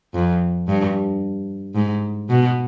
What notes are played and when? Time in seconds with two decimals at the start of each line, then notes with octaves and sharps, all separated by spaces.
0.15 F2
0.68 G2
1.75 G#2
2.29 B2